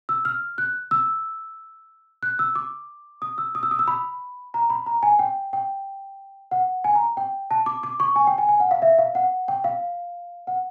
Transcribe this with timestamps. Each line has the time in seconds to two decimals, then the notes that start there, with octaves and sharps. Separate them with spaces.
0.09 E6
0.25 F6
0.58 F#6
0.91 E6
2.23 F#6
2.39 E6
2.55 D6
3.22 D#6
3.38 E6
3.55 D#6
3.63 E6
3.71 D#6
3.79 E6
3.88 B5
4.54 A#5
4.70 B5
4.86 A#5
5.03 G#5
5.19 G5
5.53 G5
6.51 F#5
6.84 G#5
6.95 A#5
7.17 G5
7.51 A5
7.66 D6
7.83 D6
8.00 C#6
8.16 G#5
8.27 G5
8.38 G#5
8.49 G#5
8.60 F#5
8.71 F5
8.82 E5
8.99 F5
9.15 F#5
9.48 G5
9.64 F5
10.47 F#5